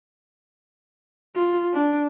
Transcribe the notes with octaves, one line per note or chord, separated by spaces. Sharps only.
F4
D4